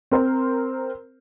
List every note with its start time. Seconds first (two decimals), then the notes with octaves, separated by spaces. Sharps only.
0.12 C4 A#4 C5